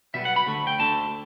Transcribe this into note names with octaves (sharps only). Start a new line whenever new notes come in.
B1 B2 G3 B3 E5
F#5
B5
D2 D3 A3
G5
D2 D3 A3 A5